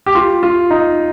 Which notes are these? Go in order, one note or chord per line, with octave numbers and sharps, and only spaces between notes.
G4
F4
F4
D#4